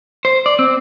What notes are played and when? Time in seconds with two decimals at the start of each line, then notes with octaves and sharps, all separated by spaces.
0.25 C5
0.46 D5
0.59 C4